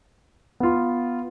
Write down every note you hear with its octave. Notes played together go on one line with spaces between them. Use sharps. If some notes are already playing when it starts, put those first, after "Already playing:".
B3 F4